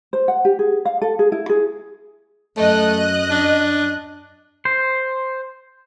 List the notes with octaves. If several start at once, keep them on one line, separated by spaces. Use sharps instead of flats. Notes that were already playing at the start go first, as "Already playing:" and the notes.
C5
F#5
G4
G#4
F5
A4
G#4
E4
G#4
F#2 A3 D#5 F#6
D4
C5